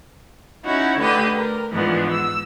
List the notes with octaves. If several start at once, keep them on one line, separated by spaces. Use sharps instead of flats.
C#4 D#4 E4 F#4
D3 A3 G4 B4 D#6
A#4
G#2 E3 F3 B3 D4
E6